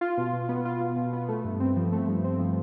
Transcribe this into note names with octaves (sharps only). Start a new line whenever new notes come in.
F4
B2
B2
B3
F4
B2
B2
B3
A3
G2
C4
F3
A3
G2
C4
F3